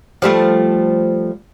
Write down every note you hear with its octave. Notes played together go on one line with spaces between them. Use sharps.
F3 G3 A3